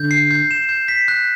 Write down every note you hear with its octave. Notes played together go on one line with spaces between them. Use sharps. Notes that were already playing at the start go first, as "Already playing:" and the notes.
Already playing: D3 G6
C7
G6
E7
G6
B6
F#6